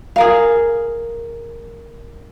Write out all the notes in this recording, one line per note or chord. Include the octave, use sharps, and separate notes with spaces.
G#4 A#4 F5